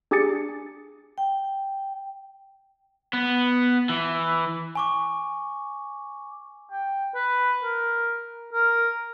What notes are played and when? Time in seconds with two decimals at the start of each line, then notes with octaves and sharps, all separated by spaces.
0.11 D4 G4 G#4 G#5 A6 C#7
1.18 G5
3.13 B3
3.89 E3
4.75 G#5 C#6 D6
6.71 G5
7.15 B4
7.63 A#4
8.53 A#4